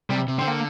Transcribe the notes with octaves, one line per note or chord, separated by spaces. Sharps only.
C3 G3
C3
D3 C4
A#3